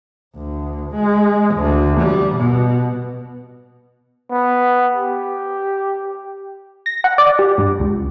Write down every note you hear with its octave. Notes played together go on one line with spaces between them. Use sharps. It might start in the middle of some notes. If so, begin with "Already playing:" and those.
D2
G#3
D2
G3
B2
B3
G4
A#6
F#5
D5
G4
G2
C#2